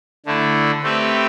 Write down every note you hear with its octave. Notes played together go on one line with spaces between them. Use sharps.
D3 A3 E4
A3 C4 G4 B4 E5